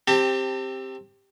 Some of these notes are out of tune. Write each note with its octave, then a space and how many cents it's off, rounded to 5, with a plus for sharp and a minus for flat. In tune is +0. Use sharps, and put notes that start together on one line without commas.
C4 +15 G4 +5 A5 +40